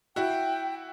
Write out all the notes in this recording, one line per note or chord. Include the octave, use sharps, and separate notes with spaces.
E4 F#4 G5